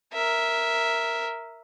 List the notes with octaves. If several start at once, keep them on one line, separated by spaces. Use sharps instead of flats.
A#4 E5